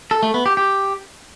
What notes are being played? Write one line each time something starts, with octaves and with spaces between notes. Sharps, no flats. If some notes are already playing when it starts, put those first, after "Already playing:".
A4
A3
B3
G4
G4